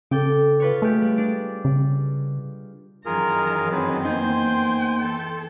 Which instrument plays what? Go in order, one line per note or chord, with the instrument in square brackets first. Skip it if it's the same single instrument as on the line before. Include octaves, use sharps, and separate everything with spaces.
[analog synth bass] C#3 [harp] A4 G5 D6
[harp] F4 B4 C#5
[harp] G#3 G4 [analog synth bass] A3
[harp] G3
D4 D5
[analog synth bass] C#3
[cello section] F#2 D#3 E3 [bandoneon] F4 G#4 A#4 [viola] A#5
[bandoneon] F#3 G#4 B4 [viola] C4
[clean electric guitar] A#3 B3 D#4 [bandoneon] C5 G#5 [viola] G5 C6
[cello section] E3 A4